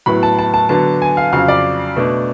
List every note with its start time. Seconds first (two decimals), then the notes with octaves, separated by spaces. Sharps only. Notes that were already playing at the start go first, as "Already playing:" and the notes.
0.06 A2 F#3 B3 B5
0.23 A5
0.39 A5
0.54 A5
0.69 D3 F#3 B3 D4 A5
1.02 G#5
1.17 F5
1.33 F2 C#3 F#3 F5
1.48 D5
1.96 B2 A3 D4